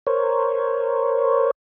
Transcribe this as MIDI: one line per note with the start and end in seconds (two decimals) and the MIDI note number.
0.07 1.51 70
0.07 1.51 72
0.07 1.51 73